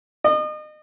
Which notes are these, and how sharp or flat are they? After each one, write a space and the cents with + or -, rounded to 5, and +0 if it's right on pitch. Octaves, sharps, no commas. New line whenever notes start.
D#5 -35